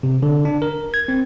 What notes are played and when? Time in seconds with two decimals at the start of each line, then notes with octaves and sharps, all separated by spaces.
0.03 C3
0.23 D3
0.45 D4
0.62 A#4
0.94 G#6
1.08 C4